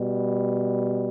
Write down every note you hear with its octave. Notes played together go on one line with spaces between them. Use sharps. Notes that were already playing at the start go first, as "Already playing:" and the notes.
Already playing: B2 G3